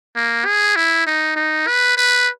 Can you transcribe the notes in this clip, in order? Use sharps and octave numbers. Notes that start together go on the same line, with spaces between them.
A#3
G#4
E4
D#4
D#4
B4
B4